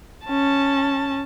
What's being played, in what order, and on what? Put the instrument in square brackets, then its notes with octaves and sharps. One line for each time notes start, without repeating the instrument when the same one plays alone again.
[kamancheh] C#4 A5